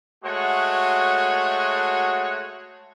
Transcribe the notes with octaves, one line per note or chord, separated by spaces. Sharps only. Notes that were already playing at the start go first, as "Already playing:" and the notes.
G#3 A3 F#4 C#5 F#5